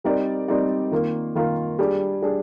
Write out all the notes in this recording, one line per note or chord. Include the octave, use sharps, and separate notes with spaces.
G3 C4 D#4 A#4 D5
G3 C4 D#4 A#4 D5
D#3 A#3 F4 A#4
D#3 A#3 F4 A#4
G3 D4 G#4
G3 D4 G#4